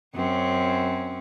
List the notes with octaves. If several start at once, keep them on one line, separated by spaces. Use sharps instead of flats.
F#2 C4 C#4